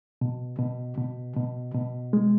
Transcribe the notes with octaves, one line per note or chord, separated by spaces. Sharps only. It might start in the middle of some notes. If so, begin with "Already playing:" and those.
B2
B2
B2
B2
B2
G#3